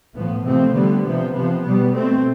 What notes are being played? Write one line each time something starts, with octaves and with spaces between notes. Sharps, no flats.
A2 F3 B3
C3 F3 A3 C4
D3 G3 B3
C3 F3 B3
C3 F3 B3
B2 G3 B3
B2 A3 C4